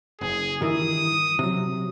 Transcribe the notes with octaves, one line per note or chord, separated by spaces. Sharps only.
F#1 G#4
G2 D#3 E3 D#6
C3 F#3